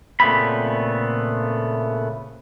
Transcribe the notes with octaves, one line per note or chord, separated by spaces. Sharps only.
A#2 C#3 A3 B3 C4 B5